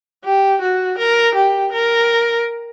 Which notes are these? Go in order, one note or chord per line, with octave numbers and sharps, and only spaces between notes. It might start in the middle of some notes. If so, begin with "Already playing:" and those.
G4
F#4
A#4
G4
A#4